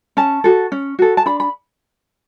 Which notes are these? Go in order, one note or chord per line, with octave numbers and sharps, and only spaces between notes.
C#4 A5
F#4 A4
C#4
F#4 A4
A5
D4 B5
B5